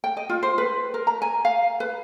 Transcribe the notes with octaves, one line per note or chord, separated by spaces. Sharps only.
G5
D#5
F4
C5
B4
A#4
A#5
G#5
F5
B4